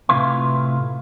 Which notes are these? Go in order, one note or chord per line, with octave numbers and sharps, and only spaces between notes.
A2 C3 E4 F4 B4 C6